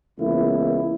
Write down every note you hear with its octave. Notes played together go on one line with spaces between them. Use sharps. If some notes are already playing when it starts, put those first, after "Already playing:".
C#2 E3 A#3 B3 E4